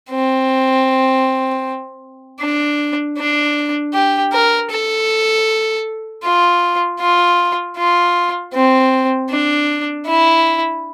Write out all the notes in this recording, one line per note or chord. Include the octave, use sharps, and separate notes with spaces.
C4
D4
D4
G4
A#4
A4
F4
F4
F4
C4
D4
E4